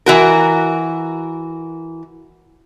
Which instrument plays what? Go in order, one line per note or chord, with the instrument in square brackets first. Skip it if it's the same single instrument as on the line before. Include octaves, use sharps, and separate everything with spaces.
[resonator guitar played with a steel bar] E3 F#4 A#4